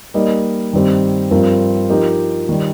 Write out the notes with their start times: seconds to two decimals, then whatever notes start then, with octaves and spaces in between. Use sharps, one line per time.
0.14 G3 A#3 D#4 A#4 D#5
0.73 G2 D#3 G3 C4 G4
1.31 G2 F3 C4 F4 A#4
1.89 F3 D#4 G4 A#4 D#5
2.49 D#3 G3